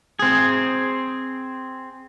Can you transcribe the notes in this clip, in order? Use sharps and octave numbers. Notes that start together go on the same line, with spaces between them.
C4 G#4